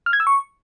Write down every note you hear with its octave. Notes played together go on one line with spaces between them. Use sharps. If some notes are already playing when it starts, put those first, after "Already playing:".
F6
G#6
E6
C#6